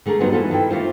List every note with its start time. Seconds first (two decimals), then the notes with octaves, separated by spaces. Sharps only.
0.06 D3 A3 G#4 A#4
0.20 F#3 G3 B3 D#4 F#4 C5
0.32 D3 E3 F4 A4
0.51 D#3 E4 G5
0.70 A3 A#3 F4 C5